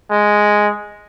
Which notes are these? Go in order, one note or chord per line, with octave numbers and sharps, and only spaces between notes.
G#3